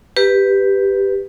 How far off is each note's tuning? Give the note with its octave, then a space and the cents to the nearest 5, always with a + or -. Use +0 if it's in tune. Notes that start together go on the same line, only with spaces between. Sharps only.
G4 +0 B4 +0